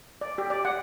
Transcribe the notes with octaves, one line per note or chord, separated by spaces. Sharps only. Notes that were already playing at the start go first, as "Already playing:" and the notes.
D5
G4
D5
F#5